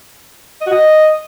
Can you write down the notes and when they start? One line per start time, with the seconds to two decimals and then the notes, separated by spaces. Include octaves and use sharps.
0.61 D#5
0.66 F#4
0.72 D#5